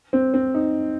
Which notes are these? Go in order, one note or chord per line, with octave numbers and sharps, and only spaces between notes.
C4
C4
D#4